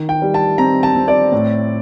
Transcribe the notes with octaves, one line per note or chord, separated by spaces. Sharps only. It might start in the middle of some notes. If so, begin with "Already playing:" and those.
Already playing: D#3
G5
G3
A5
C4 A#5
A5
C4
D5
A2